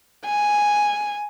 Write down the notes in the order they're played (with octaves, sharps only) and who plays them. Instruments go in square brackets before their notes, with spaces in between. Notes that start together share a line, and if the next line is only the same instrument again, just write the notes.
[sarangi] G#5